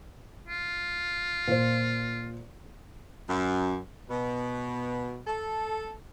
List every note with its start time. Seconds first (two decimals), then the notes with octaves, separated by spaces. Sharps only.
0.48 F4
1.48 A#2 C5
3.29 F#2
4.10 B2
5.26 A4